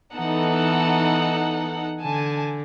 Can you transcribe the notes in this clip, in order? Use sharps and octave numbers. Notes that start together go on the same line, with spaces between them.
E3 B3 D#4 A4 F#5
D3 G#5 A5